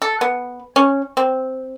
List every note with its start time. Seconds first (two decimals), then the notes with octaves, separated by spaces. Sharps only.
0.02 A4
0.21 B3
0.76 C#4
1.17 C4